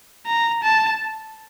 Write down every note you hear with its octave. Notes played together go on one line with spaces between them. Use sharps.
A#5
A5